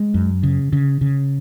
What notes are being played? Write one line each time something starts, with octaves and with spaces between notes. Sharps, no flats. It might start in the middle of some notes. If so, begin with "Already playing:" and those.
Already playing: G#3
F#2
C#3
C#3
C#3